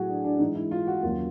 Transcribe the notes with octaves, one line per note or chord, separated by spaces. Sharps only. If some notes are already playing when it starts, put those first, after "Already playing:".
Already playing: A2 F#3 F#4 G#4
D4
D4
G#2 E3 G#3 D#4
E4
F4
F#4
D#2 C#3 F#3 F4